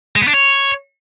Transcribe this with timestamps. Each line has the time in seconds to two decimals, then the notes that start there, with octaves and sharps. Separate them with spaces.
0.16 G#3
0.22 B3
0.28 D4
0.33 C#5